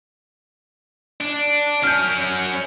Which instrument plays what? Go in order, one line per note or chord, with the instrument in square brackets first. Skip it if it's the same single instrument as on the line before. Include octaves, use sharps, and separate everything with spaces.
[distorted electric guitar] D4
[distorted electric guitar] F#3 C#4 [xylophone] F6 G6